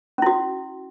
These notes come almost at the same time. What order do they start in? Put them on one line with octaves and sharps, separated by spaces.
C#4 E4 F#4